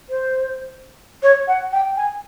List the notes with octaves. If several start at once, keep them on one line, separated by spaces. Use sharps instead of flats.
C5
C#5
F#5
G5
G#5